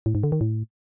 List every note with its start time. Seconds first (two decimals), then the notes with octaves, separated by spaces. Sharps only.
0.06 A2
0.15 G#2
0.23 D3
0.32 D#3
0.41 A2